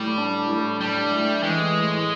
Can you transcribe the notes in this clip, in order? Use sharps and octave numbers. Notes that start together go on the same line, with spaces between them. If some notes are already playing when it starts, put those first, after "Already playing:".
Already playing: A2 G3
D4
A2
G3 D4
A3
E3 G#3
A2